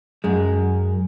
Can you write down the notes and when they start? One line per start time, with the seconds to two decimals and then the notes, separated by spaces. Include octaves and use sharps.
0.24 F#2 G#3